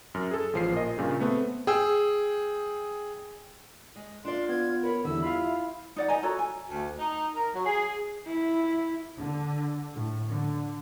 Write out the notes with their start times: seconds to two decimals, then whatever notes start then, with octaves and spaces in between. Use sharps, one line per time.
0.14 F#2 F6
0.31 G#4 A4
0.53 A1 F3 C7
0.72 A#2 D#5
0.98 G2 A#2 C#3
1.20 A3 B3 C4
1.67 G#4 G5 E6
3.96 G#3
4.25 D4 F4 D5 C6
4.49 B3 G#6
4.83 A#4 C#5 B5
5.05 E2 D3 G3 E4 E6
5.23 F4 F5 B5
5.96 D#4 D5 F#5
6.08 D#4 D#5 G#5 A#5
6.23 F#4 A4 C#5 A#5
6.39 G#5
6.70 D2
6.98 D#4
7.34 A#4
7.53 F#3
7.66 G#4
8.26 E4
9.18 D3
9.95 A2
10.31 D3